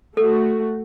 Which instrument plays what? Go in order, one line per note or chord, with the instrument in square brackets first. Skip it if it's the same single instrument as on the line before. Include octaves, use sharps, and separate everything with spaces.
[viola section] A3 F#4 [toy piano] A4